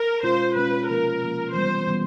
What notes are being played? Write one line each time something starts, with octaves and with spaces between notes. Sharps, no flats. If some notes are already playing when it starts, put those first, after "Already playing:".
Already playing: A#4
B2 G#3 C#4 F4 C5
B2 G#3 C#4 F4 B4
C3 F3 A#3 A#4
C3 F3 A#3
E3 G3 B3 C5
E3 G3 B3